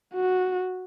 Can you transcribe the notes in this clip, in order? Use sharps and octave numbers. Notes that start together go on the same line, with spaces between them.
F#4